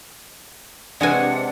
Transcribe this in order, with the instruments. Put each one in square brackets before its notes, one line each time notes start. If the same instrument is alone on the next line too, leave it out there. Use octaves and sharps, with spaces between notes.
[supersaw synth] C3 D4 [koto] G#3 F#4 G#5 [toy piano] B4 D5 [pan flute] F#5